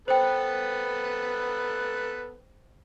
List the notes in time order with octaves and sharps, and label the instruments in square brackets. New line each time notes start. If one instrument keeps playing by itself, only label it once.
[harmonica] B3 A4 B4 [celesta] C5 G5